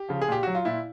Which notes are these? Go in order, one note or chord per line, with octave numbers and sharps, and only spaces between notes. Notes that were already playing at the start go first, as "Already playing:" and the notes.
Already playing: G4
C#3 F3
G#4
A#2 G4
F#3 F#4
F4
A#2 E4